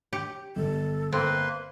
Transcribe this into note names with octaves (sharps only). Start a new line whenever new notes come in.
G4
G1 A4
A#3 C4 B4 C6